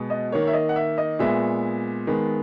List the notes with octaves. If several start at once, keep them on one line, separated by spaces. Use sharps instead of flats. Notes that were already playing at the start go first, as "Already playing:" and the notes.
Already playing: B2 G#3 B3
D#5
D#3 A#3 C#5
E5
D#5
F#5
E5
D#5
A#2 G#3 B3 E5
D#3 G#3 B3